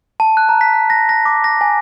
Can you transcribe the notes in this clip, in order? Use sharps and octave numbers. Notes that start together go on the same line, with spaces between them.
A5
F#6
A#5
B6
F#6
A#6
A#6
D6
A#6
G#5